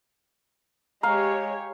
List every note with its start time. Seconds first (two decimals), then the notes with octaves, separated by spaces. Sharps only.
1.03 G#3 G4 C#5 F5 A#5